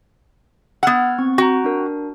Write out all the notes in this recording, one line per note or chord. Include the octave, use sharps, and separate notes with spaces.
B3 F#5 E6 F6 G#6
C4 C#6
F#4 G5 A#5
D4 A#4